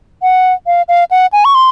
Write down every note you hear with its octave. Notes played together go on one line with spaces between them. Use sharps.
F#5
F5
F5
F#5
G#5
C#6
C6